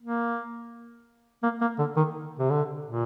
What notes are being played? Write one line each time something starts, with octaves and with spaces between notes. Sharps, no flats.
A#3
A#3
A#3
D3
D#3
C3
D3
A#2